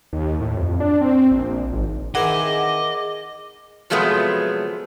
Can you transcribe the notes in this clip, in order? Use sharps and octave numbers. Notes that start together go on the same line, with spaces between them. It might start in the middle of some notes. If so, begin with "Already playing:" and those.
D#2
A2
F2
D4
C4
A#1
G#1
D#3 E3 C4 G#4 D#5 F#5 D6
C3 F3 F#3 G#3 A3 B3